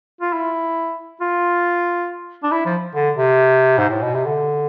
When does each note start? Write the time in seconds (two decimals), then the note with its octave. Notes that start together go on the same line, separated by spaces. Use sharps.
0.21 F4
0.33 E4
1.21 F4
2.43 D4
2.52 E4
2.66 F3
2.95 D3
3.17 C3
3.78 G#2
3.90 A2
4.02 B2
4.14 C3
4.26 D3